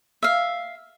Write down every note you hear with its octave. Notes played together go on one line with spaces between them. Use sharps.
E5 F5